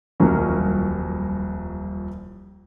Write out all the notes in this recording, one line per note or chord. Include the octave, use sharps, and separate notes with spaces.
D#1 C2 F2 F#3 A#3 C#4